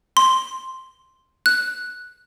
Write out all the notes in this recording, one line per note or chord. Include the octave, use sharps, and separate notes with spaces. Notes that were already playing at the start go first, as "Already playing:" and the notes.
C6
F#6